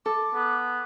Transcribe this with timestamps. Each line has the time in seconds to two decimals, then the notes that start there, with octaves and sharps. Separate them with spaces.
0.06 A4 D6
0.35 B3